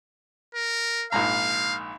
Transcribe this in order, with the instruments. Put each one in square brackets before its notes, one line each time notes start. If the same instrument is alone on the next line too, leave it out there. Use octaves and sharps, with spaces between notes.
[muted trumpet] A#4
[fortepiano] A#1 G#2 A#5 [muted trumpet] F5